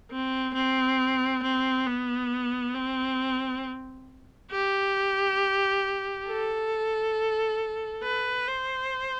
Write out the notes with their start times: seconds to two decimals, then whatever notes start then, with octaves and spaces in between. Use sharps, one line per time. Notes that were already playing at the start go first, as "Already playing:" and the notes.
0.11 C4
0.54 C4
1.43 C4
1.86 B3
2.74 C4
4.51 G4
6.28 A4
8.03 B4
8.48 C5